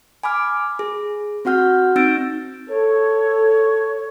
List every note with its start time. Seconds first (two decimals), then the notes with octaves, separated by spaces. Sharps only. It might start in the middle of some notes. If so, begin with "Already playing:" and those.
0.23 G#5 B5 D6 F6
0.79 G#4
1.45 C4 F#4 F#5 F6 G6
1.96 C4 D#4 E6 G6 A6 D7
2.69 A4 C#5